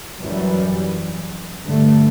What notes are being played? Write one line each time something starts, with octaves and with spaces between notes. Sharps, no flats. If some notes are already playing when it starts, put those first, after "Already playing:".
F#2 E3 G3
G2 D3 A3